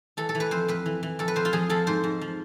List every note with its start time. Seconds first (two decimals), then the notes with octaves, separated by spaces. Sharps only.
0.17 E3 A4
0.29 A4
0.35 E3
0.40 B4
0.51 F2 C5
0.68 F2 B4
0.86 E3
1.03 E3
1.19 F2 A4
1.28 B4
1.36 F2 C5
1.45 F4
1.53 F3 G#4
1.70 F3 A4
1.87 G#2 C5
2.04 G#2
2.21 F3